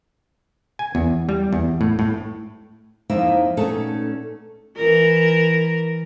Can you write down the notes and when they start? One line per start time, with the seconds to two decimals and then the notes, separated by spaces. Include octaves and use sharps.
0.79 G#5
0.95 E2
1.29 G3
1.53 E2
1.81 A2
1.99 A2
3.09 F2 F3 A#3 D#4 E4 E5
3.57 A#2 A3 B3 C#4 D#4 A4
4.77 E3 A#4